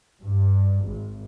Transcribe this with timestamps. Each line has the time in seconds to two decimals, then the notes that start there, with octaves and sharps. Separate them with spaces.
0.22 G2
0.84 G#1